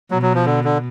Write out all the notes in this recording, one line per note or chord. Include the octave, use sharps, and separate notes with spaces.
B2 F#3
F#3
F3
D3
D3